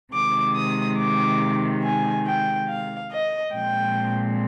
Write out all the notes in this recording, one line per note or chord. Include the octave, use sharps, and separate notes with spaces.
C3 D#3 G#3 D6
D#6
D6
G#5
G5
F5
D#5
A#2 F3 G#3 C4 G5